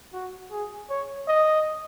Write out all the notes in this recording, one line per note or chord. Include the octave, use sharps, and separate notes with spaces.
F#4
G#4
C#5
D#5